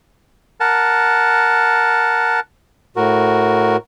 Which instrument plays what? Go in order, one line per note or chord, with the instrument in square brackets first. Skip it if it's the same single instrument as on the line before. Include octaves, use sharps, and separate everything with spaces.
[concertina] A#4 F#5 A5
[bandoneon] A2 F#4 A#4